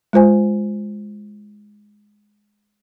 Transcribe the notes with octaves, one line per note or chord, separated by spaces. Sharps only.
G#3 F4 C5 G#5